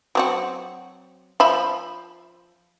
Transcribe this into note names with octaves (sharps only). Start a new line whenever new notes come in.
F#3 C4 F#4
F3 E5 B5